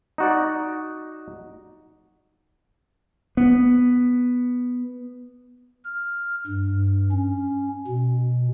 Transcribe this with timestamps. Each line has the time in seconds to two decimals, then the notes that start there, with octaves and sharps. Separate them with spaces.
0.18 D#4 F#4 D5
3.37 B3
5.84 F6
6.47 G2
7.12 C#4
7.87 B2